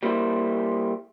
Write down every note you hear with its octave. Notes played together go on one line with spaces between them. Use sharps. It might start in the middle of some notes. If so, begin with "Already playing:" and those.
G3 A#3 E4 C5